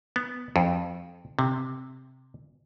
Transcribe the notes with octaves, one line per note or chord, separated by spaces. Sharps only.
B3
F2
C3